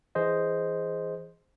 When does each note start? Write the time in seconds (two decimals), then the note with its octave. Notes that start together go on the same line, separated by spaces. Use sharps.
0.15 E3 G#4 C5 D#5